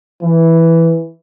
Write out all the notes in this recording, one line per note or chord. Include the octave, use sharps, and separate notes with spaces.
E3